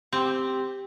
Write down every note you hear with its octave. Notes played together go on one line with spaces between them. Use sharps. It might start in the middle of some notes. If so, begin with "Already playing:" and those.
C4 G4